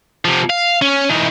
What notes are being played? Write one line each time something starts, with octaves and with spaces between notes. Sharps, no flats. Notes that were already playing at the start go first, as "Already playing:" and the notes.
C3 F3
F5
C#4
E3 D#4